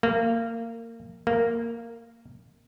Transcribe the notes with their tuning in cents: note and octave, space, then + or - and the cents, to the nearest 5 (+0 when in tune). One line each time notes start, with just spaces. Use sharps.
A#3 -25
A#3 -10